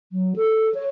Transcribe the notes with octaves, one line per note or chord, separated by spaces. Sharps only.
F#3
A4
C#5